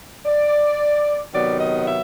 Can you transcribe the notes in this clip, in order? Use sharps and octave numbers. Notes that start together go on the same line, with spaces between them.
D5
C3 D#3 F#3 B3 D5
D#5
E5